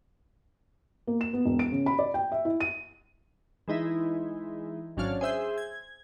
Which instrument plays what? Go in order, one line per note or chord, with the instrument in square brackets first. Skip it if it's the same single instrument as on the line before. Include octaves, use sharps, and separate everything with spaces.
[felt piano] A#3
E7
B3
E1
D7
C#3
B5
D5
G5
E5
E4
D#7
[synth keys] E3 G#3 D#4 E4
G#1 F#3 C#4 D4 F5 F6
G#4 C5 E5 G6
G#6